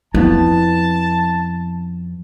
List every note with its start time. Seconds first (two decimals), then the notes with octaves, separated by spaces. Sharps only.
0.14 F2 B3 E4 A5